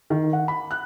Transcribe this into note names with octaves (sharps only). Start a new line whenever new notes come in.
D#3
F#5
B5
F#6